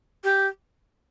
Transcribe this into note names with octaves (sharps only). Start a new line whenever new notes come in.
G4